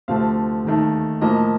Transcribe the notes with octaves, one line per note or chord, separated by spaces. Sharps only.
D2 C3 F3 A3 F5
D#2 D#3 A3
A2 F3 A#3 D#5